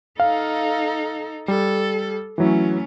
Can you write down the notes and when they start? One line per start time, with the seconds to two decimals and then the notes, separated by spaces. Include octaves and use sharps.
0.20 D#4 A4 F5
1.48 G3 A4
2.38 E3 F#3 A3 C#4 E4